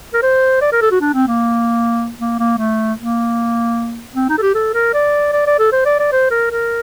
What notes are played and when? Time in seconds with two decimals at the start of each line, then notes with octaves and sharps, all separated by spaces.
0.14 A#4
0.23 C5
0.62 D5
0.72 A#4
0.82 A4
0.91 F#4
1.01 D4
1.14 C4
1.28 A#3
2.19 A#3
2.39 A#3
2.58 A3
2.98 A#3
4.15 C4
4.29 D#4
4.38 A4
4.42 G4
4.54 A4
4.74 A#4
4.94 D5
5.33 D5
5.47 D5
5.59 A4
5.72 C5
5.85 D5
5.99 D5
6.12 C5
6.31 A#4
6.51 A#4